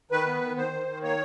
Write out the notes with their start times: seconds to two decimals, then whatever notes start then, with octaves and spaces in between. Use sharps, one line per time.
0.11 D#3 B4
0.27 B3
0.42 D#3
0.57 D#3 C5
0.72 D#3
0.87 D#3
1.03 A#3 C#5